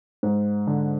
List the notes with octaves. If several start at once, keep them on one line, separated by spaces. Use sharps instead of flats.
G#2
D3